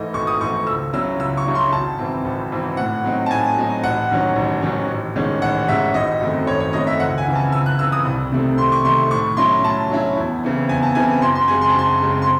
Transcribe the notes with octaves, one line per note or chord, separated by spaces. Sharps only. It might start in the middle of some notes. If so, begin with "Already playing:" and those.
Already playing: G#2 E3 A3 D#5
G#1 C#6
D#6
G#2 E3 A3 C#6
C#2 E6
C#3 F#3 C#4 E4 E6
C#2 E6
C#6
C#3 F#3 C#4 E4
C6
G#1 A5
G#2 E3 C4
G#1
G#2 E3 C4
A2 F#5
F#3 C4 D#4
A5
A2 G#5
F#3 C4 D#4
A1 F#5
G#2 D#3 F#3 C#4
A1
G#2 D#3 F#3 C#4
A1
G#2 D#3 G#3 C#4
A1 F#5
G#2 D#3 G#3 C#4 E5
G#1 D#5
F#2 D#3 A3 C4
G#1 C#5
C#5
F#2 D#3 A3 C4 D#5
E5
C#2 F#5
G#5
C#3 E3 C4
A5
C#2 E6
F#6
C#3 E3 C4 E6
D#6
C2
C3 D#3 A3 C4
C2 C6
C#6
C3 D#3 A3 C4 C6
A2 C#6
F#3 C#4 E4 C6
A2 A5
F#3 C#4 E4
E2
C#3 E3 C4
E2 G#5
A5
C#3 E3 C4 G#5
F#2 C6
C6
C#3 G#3 C4 G#5
C6
A5
F#2 C6
C#3 G#3 C4
C6